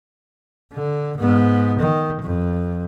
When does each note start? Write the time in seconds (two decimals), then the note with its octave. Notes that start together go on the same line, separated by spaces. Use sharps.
0.74 D3
1.18 G#2 B3
1.79 D#3
2.22 F2